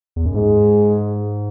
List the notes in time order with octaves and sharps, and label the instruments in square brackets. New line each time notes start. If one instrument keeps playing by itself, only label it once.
[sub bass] E2
F#2
[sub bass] G#2 [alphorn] G#3